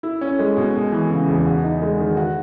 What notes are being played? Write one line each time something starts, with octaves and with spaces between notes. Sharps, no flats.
E4
C#4
G#3
B2
G#3
E3
C#3
E2
F#4
D#4
G#3
D#3
F#4